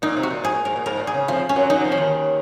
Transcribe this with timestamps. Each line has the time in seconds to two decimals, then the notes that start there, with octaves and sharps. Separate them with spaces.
0.02 A#2 D#4
0.17 C3
0.23 F#4
0.30 A#2
0.44 G#2 G#4
0.54 A#2
0.65 G#2 A#4
0.76 A#2
0.86 G#2 A#4
1.00 A#2
1.07 G#4
1.14 C#3
1.28 F2 F3 F4
1.49 C#4
1.56 F#2 F#3
1.70 F#2 F#3 D#4
1.84 F2 F3
1.92 C#4
1.98 D#2 D#3